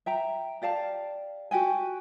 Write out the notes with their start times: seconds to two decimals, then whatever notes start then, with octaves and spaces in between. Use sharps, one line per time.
0.06 E5 G5 A#5
0.62 G4 D5 F5 A5
1.51 F#4 G4 G5 G#5